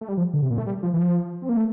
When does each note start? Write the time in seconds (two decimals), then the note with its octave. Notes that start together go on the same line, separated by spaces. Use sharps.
0.01 A3
0.09 G3
0.17 F3
0.34 D3
0.42 C3
0.50 A#2
0.58 A3
0.66 G3
0.83 F3
0.94 E3
0.99 F3
1.42 C4
1.49 A#3
1.57 A3